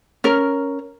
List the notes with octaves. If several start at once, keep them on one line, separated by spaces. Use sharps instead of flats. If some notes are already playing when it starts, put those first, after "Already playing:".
C#4 A#4